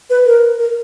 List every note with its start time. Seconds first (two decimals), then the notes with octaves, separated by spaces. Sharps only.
0.10 B4
0.25 A#4
0.59 A#4